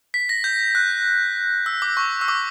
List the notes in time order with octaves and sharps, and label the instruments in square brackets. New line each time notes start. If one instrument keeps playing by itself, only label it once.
[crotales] B6
A#6
G6
F#6
E6
D6
C#6
E6
D6